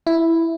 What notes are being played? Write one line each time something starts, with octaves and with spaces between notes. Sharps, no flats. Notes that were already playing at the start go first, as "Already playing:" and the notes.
E4